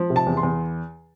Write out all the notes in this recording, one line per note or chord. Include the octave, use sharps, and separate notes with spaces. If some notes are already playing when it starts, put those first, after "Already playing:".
Already playing: F3
C3
A5
E2
C6
E2